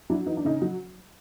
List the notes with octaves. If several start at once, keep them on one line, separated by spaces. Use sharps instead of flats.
F#3 D4 E4
E3 D#4
D4
C#3 C#4 D#4
F#3